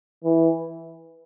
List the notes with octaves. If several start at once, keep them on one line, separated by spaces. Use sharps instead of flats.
E3